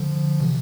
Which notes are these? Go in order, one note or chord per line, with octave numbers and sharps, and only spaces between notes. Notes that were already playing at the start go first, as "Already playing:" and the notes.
Already playing: D3 F3
C3 E3